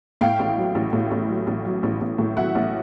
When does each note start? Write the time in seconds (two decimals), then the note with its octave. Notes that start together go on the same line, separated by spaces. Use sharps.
0.21 A2 F5 G5
0.39 A1
0.57 F#3
0.75 A1
0.93 A2
1.11 A1
1.29 F#3
1.47 A1
1.65 F#3
1.83 A1
2.01 A1
2.18 A2
2.37 F#3 E5 F#5
2.55 A1